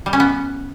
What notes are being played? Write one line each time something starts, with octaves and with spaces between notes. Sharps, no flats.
G3
C#4
B3